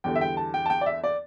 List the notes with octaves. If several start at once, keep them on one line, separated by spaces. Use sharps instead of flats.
E2 D3 G3 G5
E5
G5
A5
G5
A5
G5
D5
E5
D5